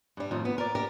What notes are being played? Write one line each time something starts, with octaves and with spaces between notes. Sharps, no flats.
G2 G3
F2 A2 D#3
B3
A#4 D5
G4 A#4